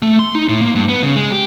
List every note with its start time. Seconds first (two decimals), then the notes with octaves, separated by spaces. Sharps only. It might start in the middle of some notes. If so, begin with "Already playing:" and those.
0.02 A3
0.19 C6
0.35 D#4
0.49 A2
0.61 A#3
0.75 G2
0.89 B3
1.03 C#3
1.16 G#3
1.32 G4